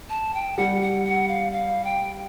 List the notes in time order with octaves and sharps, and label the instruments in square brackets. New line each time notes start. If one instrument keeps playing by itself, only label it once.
[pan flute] A5
G5
[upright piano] G3 [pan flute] F#5
[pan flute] F#5
F#5
F5
F5
G5